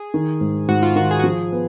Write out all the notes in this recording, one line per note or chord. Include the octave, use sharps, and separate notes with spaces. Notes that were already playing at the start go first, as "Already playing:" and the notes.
Already playing: G#4
D#3
G#2
G#2 F#4
F4
D#3 F#4
G#4
F#4
F3 G#4
B3